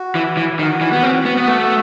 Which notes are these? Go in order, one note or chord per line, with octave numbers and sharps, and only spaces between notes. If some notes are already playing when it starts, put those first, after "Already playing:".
Already playing: F#4
E3
E3
D#3 F#4
E3
B3
C4
B3
B3
A3